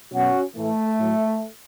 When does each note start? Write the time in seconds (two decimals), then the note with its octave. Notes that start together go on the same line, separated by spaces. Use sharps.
0.12 B2 F#3 C#4 F#4
0.55 A2 E3 A3
0.98 A2 F#3